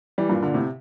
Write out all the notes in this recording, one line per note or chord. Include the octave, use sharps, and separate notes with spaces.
E3 G3
G2 A#2
A#2 D3
A2 C3